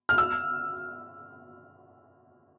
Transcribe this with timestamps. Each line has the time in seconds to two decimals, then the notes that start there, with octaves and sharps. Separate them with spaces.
0.09 F6
0.18 E6